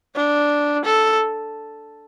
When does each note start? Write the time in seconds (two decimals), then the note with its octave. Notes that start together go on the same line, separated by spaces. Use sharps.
0.16 D4
0.85 A4